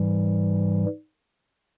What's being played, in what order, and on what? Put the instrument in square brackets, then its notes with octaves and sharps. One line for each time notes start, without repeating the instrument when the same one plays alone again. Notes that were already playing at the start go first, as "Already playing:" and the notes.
Already playing: [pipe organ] G#2 E3 G3